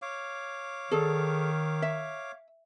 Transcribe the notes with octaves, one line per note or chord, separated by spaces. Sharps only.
C#5 F5 D6
D#3 G#4 A4 D5
E5